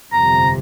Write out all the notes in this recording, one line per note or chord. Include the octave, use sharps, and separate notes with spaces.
G1 F2 C3 A#5